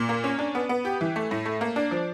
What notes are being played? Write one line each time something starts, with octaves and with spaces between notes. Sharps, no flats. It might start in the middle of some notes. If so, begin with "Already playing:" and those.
Already playing: A#2
A#3
C#4
D4
B3
B3
G4
E3
A3
A2
A3
A#3
D4
F3